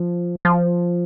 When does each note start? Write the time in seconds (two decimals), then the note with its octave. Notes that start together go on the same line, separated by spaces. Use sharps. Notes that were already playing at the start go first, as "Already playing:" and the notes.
Already playing: F3
0.45 F3